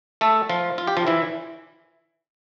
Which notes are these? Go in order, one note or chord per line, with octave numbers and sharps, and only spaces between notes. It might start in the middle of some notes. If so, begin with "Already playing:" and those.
A3 A4
F3 F4
F4
G4
F3 F4
E3 E4